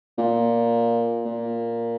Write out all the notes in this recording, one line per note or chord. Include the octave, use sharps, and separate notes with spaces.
A#2
A#2